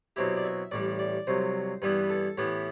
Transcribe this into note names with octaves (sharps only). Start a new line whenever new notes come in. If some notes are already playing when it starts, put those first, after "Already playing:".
B2 F#3 C4 E4 G4
D5
E5
A1 A2 G3 D5
D5
C2 C3 F#3 C5
G2 E3 G3 B3 E4 B4
A4
A2 E3 B3 E4 G4